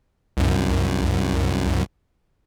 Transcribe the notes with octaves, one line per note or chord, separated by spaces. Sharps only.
C2 F#2